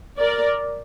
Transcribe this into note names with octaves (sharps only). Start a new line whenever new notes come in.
A#4 D5